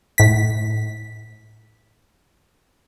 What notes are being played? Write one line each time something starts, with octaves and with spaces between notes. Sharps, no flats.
A2 B6